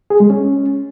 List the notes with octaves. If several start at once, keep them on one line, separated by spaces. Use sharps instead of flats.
G#4
G#3
C#4